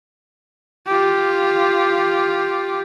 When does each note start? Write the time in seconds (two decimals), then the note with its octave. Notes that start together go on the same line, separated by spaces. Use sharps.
0.87 F4 G4